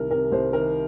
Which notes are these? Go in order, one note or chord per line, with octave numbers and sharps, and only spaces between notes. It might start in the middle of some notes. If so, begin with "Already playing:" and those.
Already playing: C2 D#3 A#4
C3 A#4
C2 C5
D#3 A#4